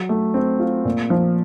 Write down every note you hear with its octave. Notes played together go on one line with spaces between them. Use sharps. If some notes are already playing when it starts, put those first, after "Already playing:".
Already playing: F#3
A3
C4
F4
A#2
F3